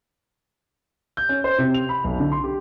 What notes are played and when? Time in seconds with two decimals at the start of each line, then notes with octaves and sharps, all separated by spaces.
1.17 G6
1.29 C#4
1.44 C5
1.58 C3
1.74 F7
1.89 B5
2.04 B1
2.20 D3
2.32 C6
2.44 G4